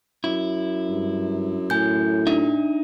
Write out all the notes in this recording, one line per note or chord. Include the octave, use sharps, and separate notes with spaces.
F#2 E4
G2
A2 G#5 G6
D4 D#4 E5